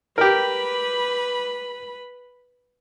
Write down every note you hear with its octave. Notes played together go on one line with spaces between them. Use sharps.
G4 A#4 B4 B5